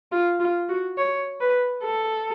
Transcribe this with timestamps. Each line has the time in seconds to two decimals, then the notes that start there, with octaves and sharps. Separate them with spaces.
0.12 F4
0.40 F4
0.69 F#4
0.97 C#5
1.40 B4
1.83 A4